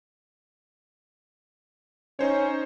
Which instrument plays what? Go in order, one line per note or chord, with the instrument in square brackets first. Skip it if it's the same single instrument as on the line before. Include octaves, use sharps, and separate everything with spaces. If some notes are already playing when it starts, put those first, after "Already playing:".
[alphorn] C#4 [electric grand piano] D#4 C5 C#5